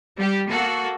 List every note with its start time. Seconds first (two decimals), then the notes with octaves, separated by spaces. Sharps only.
0.16 G3 G4
0.48 A#3 F#4 A4